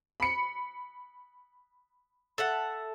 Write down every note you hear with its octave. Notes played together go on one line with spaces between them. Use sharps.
B5 C#7
A4 E5 F#5